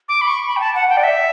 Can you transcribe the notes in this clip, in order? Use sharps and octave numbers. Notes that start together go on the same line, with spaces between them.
D6
B5
C#6
B5
G5
A5
F#5
G5
D5
E5